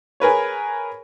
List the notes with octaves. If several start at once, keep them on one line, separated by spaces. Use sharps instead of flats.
G#4 A#4 B4 C#5